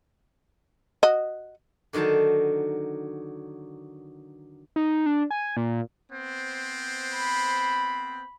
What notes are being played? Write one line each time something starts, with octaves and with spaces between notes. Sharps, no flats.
F#4 D#5
D3 D#3 F#3 C5 A5
D#4
D4
G#5
A#2
B3 C4 C5
B5